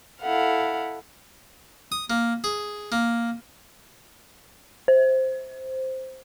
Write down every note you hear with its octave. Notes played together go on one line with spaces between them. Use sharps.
E4 A4 F5 F#5
D#6
A#3
G#4
A#3
C5